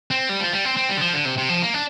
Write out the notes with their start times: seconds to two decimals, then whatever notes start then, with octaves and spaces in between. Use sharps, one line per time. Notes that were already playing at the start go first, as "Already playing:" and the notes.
0.11 C4
0.29 G3
0.40 F3
0.53 G3
0.65 C4
0.77 C4
0.89 G3
0.97 D3
1.01 F3
1.13 D3
1.25 C3
1.38 C3
1.49 F3
1.62 A#3
1.74 D4